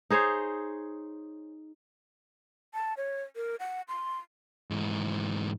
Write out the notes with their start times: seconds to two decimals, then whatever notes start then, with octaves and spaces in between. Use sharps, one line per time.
0.10 D#4 G#4 C5 C#5
2.74 A5
2.97 C#5
3.36 A#4
3.60 F#5
3.88 C6
4.71 G#2 E3